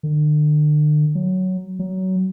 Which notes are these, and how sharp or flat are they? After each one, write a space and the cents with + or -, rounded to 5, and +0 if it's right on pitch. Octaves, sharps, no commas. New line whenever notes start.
D3 +40
F#3 +5
F#3 +20